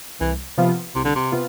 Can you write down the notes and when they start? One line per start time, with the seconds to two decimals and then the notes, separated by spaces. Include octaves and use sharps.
0.20 C2 E3
0.57 C3 F3 B3 F4
0.95 C2 C3
1.05 D3
1.15 C3
1.32 C3 B3 F4